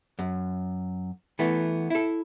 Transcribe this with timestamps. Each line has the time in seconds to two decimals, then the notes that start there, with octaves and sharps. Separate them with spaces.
0.19 F#2
1.39 E3 A3 B3
1.90 E4 A4